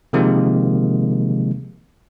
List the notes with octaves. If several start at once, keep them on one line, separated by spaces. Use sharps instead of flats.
C3 D#3 F3 G#3 A#3